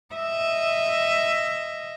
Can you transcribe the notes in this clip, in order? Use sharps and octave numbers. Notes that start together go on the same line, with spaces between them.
D#5 E5